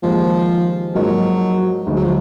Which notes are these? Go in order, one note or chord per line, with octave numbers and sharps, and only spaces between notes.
D#2 D#3 F3 G#3
G#2 F3 F#3 A#3 D#4 A#4
D2 D3 G#3 D#4
F#3
F3